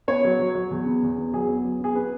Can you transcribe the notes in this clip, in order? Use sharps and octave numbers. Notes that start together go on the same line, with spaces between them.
B3 C#5
F#3
F#3
F#3
E2
B3
E2
B3
F#3 G#4
B3
F#3
B3 G#4
B3 B4